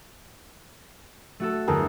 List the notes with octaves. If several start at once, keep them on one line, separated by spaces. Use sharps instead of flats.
A3 F#4 A4
G1 E2 G#4 A#4 A5